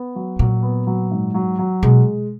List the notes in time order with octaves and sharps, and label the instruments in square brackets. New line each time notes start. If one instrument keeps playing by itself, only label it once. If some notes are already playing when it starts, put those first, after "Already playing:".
Already playing: [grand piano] B3
F#3
[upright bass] A#2 [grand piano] F#3
[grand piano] B3
F#3
G#2
F#3
F#3
[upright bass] B2 [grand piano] G#3